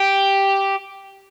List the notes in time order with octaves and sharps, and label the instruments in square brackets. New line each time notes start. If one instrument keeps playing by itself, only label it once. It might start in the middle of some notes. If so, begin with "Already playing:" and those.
Already playing: [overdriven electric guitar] G4